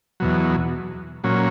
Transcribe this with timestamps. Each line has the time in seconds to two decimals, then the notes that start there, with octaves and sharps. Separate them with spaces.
0.20 E2 B2 F#3
1.24 A#2 F#3 C#4